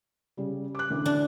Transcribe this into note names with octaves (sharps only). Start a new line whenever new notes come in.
C#3 G3
D6 F#6
A1 D2
D4